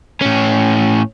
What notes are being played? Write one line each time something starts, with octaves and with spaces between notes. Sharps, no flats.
A2 C#4